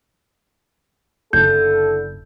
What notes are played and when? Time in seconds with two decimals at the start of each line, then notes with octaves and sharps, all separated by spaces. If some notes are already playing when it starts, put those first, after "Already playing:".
1.33 F#1 D3 E4 A4 G6